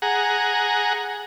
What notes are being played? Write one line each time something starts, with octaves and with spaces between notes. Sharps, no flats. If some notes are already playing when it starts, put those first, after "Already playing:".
G#4 F#5 A#5